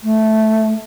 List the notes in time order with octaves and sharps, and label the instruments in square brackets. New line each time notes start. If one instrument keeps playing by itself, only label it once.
[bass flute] A3